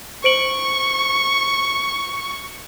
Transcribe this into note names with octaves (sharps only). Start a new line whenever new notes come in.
C5 C#6 D7 F#7